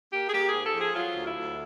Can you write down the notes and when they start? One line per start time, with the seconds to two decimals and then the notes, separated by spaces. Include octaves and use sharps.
0.11 A#3 G4
0.28 G#4
0.31 A#3 G4
0.47 G#4
0.52 G#2
0.63 A4
0.73 F3 G#4
0.93 F#3 F4
1.14 D2
1.24 E4
1.34 D2